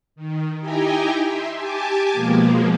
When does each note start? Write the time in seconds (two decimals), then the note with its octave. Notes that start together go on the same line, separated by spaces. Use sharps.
0.16 D#3
0.59 D#4 E4 G4 G5 G#5 A#5
1.24 E5 C6
1.55 G4 G#5 A5 D6
2.13 B2 F3 G#3 A#3